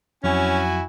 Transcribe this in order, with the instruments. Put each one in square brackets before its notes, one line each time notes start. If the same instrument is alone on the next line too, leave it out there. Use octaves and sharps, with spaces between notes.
[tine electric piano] F2 F#3 [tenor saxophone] C#4 [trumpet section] E4 F#4 G#5